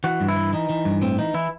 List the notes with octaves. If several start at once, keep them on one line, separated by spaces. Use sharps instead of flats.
E3 F#4
G2
E4
E3
E3 D#4
E3
G2
A2 C4
E3 D#4
E3 E4